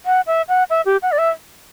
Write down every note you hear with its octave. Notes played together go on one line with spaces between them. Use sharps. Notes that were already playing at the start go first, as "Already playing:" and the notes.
F#5
E5
F#5
E5
G4
F#5
D5
E5